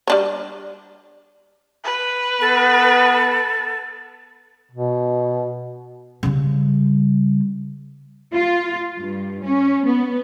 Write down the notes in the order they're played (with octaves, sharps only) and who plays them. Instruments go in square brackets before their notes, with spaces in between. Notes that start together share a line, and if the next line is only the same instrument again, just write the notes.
[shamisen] G3 D4 C#5
[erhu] B4
[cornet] B3 [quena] A4
[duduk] B2
[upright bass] C#3 G3
[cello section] F4
G2
C#4
B3